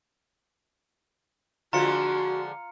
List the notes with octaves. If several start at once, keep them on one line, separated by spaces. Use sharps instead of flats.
D3 F3 G#3 F4 F#4 A#5 C#7